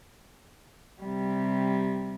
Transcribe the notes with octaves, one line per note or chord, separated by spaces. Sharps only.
C3 G3